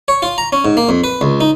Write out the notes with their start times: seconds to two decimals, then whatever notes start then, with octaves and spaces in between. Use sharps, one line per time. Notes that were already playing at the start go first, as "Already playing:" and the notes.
0.08 C#5
0.22 F4
0.38 A#5
0.53 C#4
0.65 G#2
0.77 A#3
0.89 F2
1.04 B4
1.21 C#2
1.41 D#4